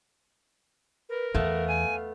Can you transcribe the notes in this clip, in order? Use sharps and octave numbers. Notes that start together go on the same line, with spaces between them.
A#4 B4
E2 A3 B3 F5
G#5